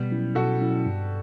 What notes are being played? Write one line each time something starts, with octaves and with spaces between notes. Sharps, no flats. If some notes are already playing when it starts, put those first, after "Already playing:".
Already playing: B2 G3 B3
F#3 C#4 E4
B2 F#4 A4
F#3 C#4 E4
G2